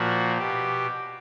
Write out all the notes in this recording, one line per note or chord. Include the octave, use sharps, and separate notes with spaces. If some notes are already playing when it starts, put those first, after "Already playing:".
Already playing: A#2 F3 F#4
B2 G4